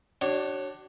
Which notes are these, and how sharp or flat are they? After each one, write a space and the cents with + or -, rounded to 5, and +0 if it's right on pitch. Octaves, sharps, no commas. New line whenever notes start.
D4 +10 F#4 +40 C#5 -15